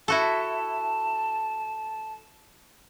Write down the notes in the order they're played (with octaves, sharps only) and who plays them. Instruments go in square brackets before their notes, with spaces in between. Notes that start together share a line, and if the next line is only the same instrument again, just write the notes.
[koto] E4 F#4 A4 [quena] A5